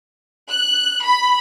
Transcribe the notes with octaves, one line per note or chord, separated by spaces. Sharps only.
F#6
B5